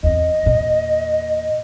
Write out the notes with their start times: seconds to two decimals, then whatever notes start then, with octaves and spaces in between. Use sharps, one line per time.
0.03 E2 C4 D#5
0.43 E2 A#2